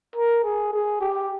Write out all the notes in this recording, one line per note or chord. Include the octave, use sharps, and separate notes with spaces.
A#4
G#4
G#4
G4